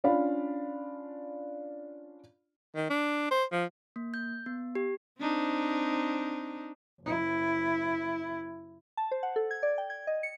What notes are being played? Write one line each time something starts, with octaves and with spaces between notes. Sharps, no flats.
C#4 D4 F4 F5 B5
D#3
D4
C5
F3
A#3
G6
B3
G4
C4 D4 D#4
F#1 E4
A5
C5
F#5
A4
G#6
D5
G5
G#6
D#5
C#7